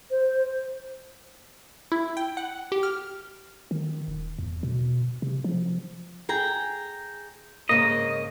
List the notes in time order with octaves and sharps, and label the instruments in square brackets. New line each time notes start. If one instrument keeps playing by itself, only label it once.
[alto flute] C5
[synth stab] E4
G5
F#5
G4
F6
[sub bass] D#3
D#1
E2
B2
C3
F3
[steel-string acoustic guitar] G#4 G5 A#5
[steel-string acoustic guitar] G#2 C#3 A#3 [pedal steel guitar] D#5